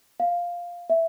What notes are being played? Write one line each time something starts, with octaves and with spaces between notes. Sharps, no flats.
F5
E5